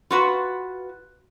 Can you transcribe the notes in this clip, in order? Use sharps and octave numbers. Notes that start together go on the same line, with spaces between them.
F4 F#4 B4